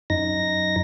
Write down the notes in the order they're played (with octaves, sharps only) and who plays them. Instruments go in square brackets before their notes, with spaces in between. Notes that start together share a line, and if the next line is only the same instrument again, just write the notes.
[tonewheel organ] F#2 D#4 A#6